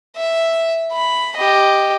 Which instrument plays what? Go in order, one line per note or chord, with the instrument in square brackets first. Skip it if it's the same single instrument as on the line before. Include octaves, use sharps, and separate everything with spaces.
[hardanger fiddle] E5
B5
G4 D#5